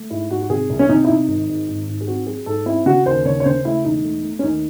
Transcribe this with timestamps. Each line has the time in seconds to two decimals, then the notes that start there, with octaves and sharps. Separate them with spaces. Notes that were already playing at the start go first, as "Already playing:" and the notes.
Already playing: A3
0.10 G#2 E4
0.30 G#2 F#4
0.42 F#4
0.50 C3 G#4
0.70 C2
0.79 C#4
0.89 C3 D#4
1.04 E4
1.09 C3 D#4
1.28 G#1
1.49 G#2
1.68 G#1
1.87 G#2
2.01 G#4
2.07 C4 F#4
2.27 F#3 G#4
2.46 G#2 A4
2.66 C4 E4
2.86 C#3 F#4
3.06 D#2 C5
3.25 C#3 C#5
3.40 C#5
3.45 C#3 C5
3.65 A3 E4
3.85 E1 D#4
4.04 A3
4.24 A3
4.39 C#4
4.43 D#2 D#4